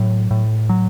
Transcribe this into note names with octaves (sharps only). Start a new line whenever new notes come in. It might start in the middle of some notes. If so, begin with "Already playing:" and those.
Already playing: A2 F#3
A2
F#3